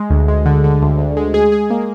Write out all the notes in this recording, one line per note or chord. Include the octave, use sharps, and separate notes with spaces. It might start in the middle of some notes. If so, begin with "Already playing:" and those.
Already playing: G#3
D2
G#3
D3
D3
D2
D2
G#3
G#4
G#4
A#3